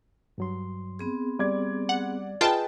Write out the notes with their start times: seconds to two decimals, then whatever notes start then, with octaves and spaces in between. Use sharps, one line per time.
0.38 G2 F#3 C6
0.99 B3 C4 G#4
1.39 G3 D5 D6 G#6
1.89 F#5
2.41 F4 G#4 B4 D#5 G5 A5